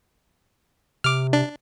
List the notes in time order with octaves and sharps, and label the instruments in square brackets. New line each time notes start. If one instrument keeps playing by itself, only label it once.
[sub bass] C3 [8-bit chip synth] D6 F6
[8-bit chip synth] D4